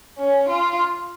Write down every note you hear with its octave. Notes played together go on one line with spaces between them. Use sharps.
C#4
F4